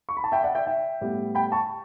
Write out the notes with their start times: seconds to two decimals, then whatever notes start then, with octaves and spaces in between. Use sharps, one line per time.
0.09 C#6
0.17 B5
0.24 A5
0.32 E5 G5
0.43 D5 F#5
0.55 E5 G5
0.67 E5 G5
1.01 A2 G3 B3
1.35 G5 B5
1.52 A5 C#6